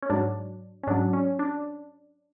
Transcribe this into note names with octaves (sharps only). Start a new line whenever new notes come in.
C#4
G#2 F#3 D4
C#4
G#2 F#3 D4
C#4
D4